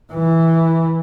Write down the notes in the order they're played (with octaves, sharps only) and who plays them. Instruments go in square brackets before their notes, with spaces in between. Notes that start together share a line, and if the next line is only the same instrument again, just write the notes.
[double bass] E3